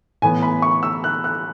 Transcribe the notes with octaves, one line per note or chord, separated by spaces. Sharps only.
A2 E3 B3 G#5
B5
C#6
E6
F#6
F#6